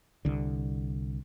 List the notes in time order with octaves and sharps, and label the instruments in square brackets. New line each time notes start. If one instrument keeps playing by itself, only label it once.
[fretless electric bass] C2 D3